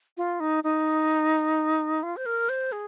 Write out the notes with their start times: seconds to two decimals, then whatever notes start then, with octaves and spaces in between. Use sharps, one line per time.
0.17 F4
0.40 D#4
0.64 D#4
2.03 F4
2.17 C5
2.26 A#4
2.49 C5
2.72 G#4